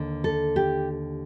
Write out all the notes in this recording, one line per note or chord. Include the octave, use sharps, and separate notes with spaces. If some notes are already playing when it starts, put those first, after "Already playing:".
Already playing: D#2 D3
A4
G4